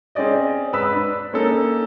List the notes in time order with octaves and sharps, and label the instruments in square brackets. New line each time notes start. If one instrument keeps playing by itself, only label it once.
[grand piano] C4 C#4 G#4 D5 D#5
G#2 B4 E6 B6
D4
A#3 C#4 D#4 A4 A#4